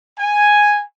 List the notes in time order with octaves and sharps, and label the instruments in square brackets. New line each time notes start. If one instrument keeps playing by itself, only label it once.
[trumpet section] G#5